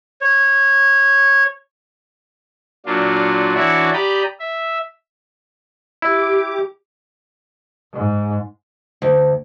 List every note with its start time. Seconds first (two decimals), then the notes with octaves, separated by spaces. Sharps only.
0.21 C#5
2.86 A#2 F#3 D4 F4
3.55 E3 D4 E4 F#4 C#5 D5
3.93 G4 D5 A#5 B5 D#6 G6
4.40 E5
6.02 E4 G4 D6
7.94 G#2
9.02 D2